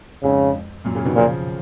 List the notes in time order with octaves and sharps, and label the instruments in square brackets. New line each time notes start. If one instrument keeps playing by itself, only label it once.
[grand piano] F2 G#2 [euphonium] C#3
[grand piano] F#2 A#2
A#2 C#3
B2 D#3
[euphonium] A#2 [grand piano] C#3 F3